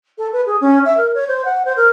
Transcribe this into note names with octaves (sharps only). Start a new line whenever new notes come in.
A4
B4
G#4
C#4
E5
A#4
C#5
C5
F#5
C5
A#4